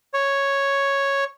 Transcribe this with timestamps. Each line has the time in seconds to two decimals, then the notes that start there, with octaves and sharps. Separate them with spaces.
0.14 C#5